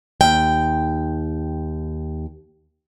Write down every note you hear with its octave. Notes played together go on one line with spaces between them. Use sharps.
D#2 G5